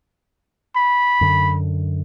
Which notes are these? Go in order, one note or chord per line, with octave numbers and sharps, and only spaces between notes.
B5
F#2 D3